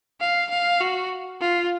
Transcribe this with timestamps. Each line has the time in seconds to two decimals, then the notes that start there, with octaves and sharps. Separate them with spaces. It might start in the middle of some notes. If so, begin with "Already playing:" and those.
0.21 F5
0.50 F5
0.81 F#4
1.41 F4